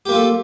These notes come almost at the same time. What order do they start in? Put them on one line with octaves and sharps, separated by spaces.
G4 A#3 F4 A4